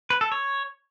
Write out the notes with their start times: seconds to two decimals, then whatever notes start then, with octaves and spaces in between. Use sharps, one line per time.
0.10 B4
0.21 A4
0.32 C#5